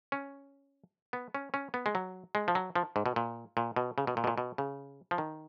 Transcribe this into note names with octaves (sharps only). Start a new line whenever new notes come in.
C#4
B3
C#4
C#4
B3
G#3
F#3
G#3
F3
F#3
F3
G#2
B2
A#2
A#2
B2
C#3
B2
A#2
B2
A#2
B2
C#3
F3
D#3